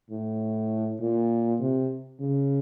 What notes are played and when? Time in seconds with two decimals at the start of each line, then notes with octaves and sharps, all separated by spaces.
0.10 A2
1.00 A#2
1.60 C3
2.20 C#3